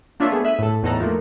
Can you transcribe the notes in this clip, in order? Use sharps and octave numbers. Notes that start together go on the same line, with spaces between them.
A#3 D4 F4 C#5 E5
A3 B3 G#4
E5 F#6 B6 D#7
A2 A4
E2 A2 D#4 A4 A#5 F#6
F3 A3 A#3